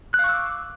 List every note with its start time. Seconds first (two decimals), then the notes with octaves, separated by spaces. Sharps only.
0.14 F#6
0.19 F5
0.24 C#6
0.29 E6
0.34 D6